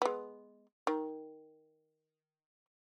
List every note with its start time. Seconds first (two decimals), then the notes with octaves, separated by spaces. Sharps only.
0.02 G#3 B3
0.87 D#3